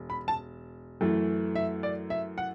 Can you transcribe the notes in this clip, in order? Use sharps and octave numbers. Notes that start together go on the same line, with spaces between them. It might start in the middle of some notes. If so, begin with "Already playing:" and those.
Already playing: E1
B5
A5
F#2 E3 A3
E5
D5
E5
F#5